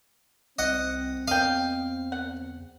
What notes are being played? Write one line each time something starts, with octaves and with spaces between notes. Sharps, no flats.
C2 C4 D#5 F#5
E2 D#5 F5 G5
F#5